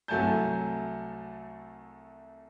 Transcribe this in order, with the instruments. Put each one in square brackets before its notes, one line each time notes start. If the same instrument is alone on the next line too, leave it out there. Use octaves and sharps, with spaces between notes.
[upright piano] C2 F#3 A3 G#5 A5 G6